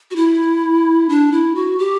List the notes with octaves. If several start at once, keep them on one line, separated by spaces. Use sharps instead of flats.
F#4
E4
D4
E4
F#4
G4